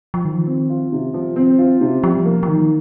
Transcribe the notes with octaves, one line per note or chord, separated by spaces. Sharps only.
F3
D#3 F3
C4
F4
C3
F3
C4
F4
C3
F3 G3
A#3
F3
D#3 D#4